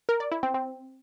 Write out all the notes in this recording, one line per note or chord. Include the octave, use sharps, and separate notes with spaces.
A#4
D5
E4
C4
C4